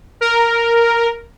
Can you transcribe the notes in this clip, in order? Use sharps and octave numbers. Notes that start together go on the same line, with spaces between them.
A#4